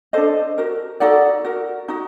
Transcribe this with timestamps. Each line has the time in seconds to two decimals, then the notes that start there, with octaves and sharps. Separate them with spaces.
0.13 D4 A4 C5 D#5
0.58 F#4 A#4
1.00 D#4 F#4 A4 D5 F#5
1.45 F#4 A#4
1.88 D#4 F#4